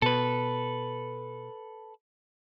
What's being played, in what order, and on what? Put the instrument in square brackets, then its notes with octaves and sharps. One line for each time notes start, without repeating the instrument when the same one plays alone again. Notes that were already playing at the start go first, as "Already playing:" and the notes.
[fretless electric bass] B2 [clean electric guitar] A4 B4